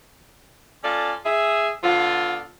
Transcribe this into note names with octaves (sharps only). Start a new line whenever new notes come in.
C#4 F4 A4 D5
G#4 E5
D3 B3 F4